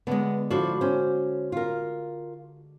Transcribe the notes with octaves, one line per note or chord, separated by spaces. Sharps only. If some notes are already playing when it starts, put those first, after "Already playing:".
D3 G#3 B3
F3 D4 E4 F#4 A4
C#4 C5
F4 A#4